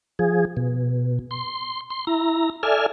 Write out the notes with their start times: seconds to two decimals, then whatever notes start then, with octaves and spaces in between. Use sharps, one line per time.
0.19 F3 G#4
0.57 B2
1.31 C6
1.90 C6
2.07 E4 A#5
2.63 A4 D5 E5 G#5 F6